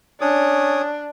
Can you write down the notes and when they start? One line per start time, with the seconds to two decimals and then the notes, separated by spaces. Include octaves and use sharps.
0.21 C#4 D4 C#5 D#6